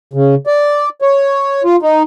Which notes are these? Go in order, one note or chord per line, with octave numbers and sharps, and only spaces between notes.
C#3
D5
C#5
F4
D#4